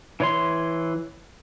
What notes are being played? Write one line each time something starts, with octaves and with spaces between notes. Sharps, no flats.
E3 C#5 C6